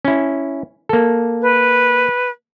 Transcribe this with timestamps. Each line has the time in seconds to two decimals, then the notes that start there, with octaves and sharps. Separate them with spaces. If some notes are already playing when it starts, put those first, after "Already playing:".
0.05 C#4 E4
0.89 A#3 A4
1.42 B4